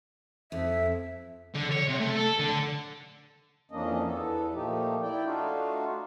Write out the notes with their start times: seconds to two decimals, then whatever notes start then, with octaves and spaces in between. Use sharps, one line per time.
0.52 F2 E5
1.55 D3
1.72 C#5
1.88 C3
2.00 A3
2.16 A4
2.40 D3
3.71 F2 E3 A#3 C#4 D4 D#5
4.06 E2 B3 A4
4.54 A#2 F3 A3 D#4 G4
5.02 E4 D5 G5
5.25 A3 D4 D#4 F4 F#4